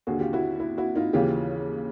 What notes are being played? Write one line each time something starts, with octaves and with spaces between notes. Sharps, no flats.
D#2 D3 F#4 G#4
F4 G4
E4 F#4
E4
E4 F#4
D#4 F4
D#2 C#3 E3 F4 G4